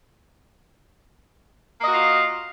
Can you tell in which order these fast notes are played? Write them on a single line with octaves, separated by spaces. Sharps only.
A#3 D#5 F#4 F4